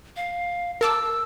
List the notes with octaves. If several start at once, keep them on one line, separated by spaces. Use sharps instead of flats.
F5
A#4 A5 D6 E6